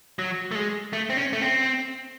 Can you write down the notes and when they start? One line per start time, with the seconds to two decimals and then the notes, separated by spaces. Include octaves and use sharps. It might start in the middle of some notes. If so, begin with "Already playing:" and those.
0.19 F#3
0.51 A3
0.55 G#3
0.93 A3
1.10 C4
1.17 C#4
1.33 A3
1.42 C4